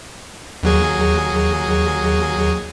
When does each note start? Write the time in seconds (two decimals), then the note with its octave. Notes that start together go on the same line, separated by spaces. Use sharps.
0.63 D#2 F#3 G#4